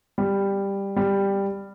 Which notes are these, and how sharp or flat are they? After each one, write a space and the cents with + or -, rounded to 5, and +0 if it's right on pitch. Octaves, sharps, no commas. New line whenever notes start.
G3 +10
G3 +10